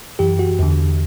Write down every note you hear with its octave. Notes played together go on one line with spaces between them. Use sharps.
F#2 E3 G4
F#4
E2 D3